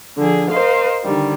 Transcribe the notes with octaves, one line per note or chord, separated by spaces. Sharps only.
D3 F3 G#4
A#4 C5 D#5 F5
D3 D#3 G3